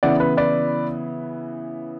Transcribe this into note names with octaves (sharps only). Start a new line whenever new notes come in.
C#3 E3 B3 E4 D5 F#5
B4
B4 D5